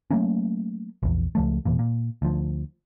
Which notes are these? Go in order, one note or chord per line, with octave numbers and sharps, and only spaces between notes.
F#3 A3 A#3 C#4
A#1 E2
C#2 F3 A3
E1 E2 A#2
A#2
D2 F3